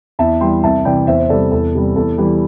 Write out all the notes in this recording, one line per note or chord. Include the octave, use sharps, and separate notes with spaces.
E2 E5 A5
E3 G3 G5 C6
C2 E5 A5
C3 E3 D5 G5
E2 C5 E5
C5
C3 G3 A4 D5
E2 A4
C3 G3 G4
E2 A4
E3 G3 G4